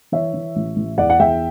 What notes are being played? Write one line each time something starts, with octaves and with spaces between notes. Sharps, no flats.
E3 C#5 E5
E3
A1
A1
E2 D5 F#5
F#5
E2 E5 G5